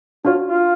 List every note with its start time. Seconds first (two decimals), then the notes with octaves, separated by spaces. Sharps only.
0.25 D4 F4 F#4 C#5
0.48 F4